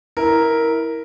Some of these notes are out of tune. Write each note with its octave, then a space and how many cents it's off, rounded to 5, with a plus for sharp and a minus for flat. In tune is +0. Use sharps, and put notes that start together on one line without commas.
E4 -15 A#4 +0